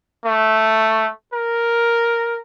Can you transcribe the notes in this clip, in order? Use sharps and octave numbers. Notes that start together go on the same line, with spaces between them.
A3
A#4